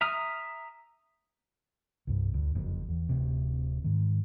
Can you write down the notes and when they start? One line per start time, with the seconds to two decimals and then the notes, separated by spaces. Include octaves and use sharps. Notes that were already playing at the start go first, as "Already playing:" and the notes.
0.01 E5 A#5 D#6 F6
2.07 C2 G2
2.34 D2
2.55 F#1 F2
2.89 E2
3.09 D1 C3
3.84 G#2 D#3